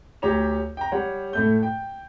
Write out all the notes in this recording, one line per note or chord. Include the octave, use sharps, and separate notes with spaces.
D2 G4 C#5 A#5 F7
G5 A#5
G3 C#5 F#5
A2 A3 G6
G5